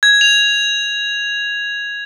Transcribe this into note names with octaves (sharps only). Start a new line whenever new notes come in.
G#6
F7